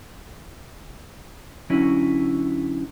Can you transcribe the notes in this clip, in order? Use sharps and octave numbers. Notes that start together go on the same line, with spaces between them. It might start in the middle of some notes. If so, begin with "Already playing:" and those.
D3 F#3 C#4 E4